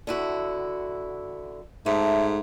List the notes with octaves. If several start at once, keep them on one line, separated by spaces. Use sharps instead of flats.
D3 E4 F#4
G#2 A3 E5